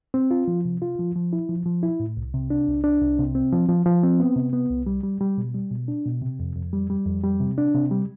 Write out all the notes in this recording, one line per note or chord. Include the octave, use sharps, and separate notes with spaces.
C4
F4
F3
C3
F4
F3
F3
E4
F3
F3
E4
A2
C2
C3
D4
C2
D4
C2
C3
C4
F3
F3
F3
C4
B3
C3
B3
C2
G3
G3
G3
B2
G3
B2
D4
B2
C3
F2
F2
G3
G3
F2
G3
C3
D4
C3
G3